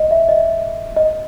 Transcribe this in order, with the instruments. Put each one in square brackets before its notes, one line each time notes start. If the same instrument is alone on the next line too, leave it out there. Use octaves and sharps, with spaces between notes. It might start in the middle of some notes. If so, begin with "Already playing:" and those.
Already playing: [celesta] D#5
E5
D#5
D#5